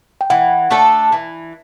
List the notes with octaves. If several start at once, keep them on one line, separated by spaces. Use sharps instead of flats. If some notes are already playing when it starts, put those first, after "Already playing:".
G5
E3 F#5
A3 D4 A4
E3